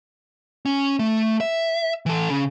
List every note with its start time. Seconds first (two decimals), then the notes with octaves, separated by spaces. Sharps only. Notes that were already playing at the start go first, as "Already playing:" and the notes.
0.65 C#4
0.99 A3
1.40 E5
2.06 E3 A4
2.30 C#3